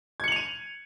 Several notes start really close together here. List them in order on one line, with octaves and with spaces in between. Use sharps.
G#6 C#7 F#7 F7 D#7